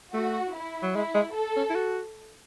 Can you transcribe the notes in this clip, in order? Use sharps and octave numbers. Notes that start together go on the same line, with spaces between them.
A3 F#4
E4
F#3
G#3 E4
G#3
A4
C#4
E4
F#4